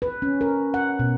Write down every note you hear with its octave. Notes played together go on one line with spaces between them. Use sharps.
B4
C#4
A#4
F#5
B2